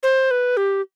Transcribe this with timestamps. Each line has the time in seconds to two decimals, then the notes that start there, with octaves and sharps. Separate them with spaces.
0.03 C5
0.31 B4
0.57 G4